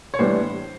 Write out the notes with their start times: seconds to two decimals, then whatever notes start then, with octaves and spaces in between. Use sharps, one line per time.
0.14 C#5
0.19 A2 E3 G3 B3 D4 C5